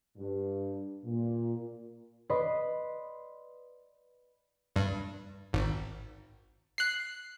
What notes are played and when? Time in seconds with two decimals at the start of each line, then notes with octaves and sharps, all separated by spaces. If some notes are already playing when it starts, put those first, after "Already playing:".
0.17 G2
1.04 A#2
2.29 B4 D5 D#5 C6
4.76 G2
5.53 G#1
6.78 F#6 C7